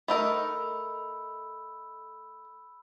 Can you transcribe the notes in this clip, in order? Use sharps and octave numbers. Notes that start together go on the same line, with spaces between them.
A3 D#4 A#4 B5 E6